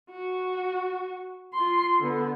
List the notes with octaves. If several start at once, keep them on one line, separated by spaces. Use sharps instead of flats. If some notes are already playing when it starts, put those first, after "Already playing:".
F#4
F4 C6
D3 B3